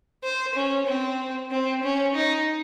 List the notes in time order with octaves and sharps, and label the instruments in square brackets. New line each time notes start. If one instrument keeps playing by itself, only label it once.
[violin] C5
C#4
C4
C4
C#4
D#4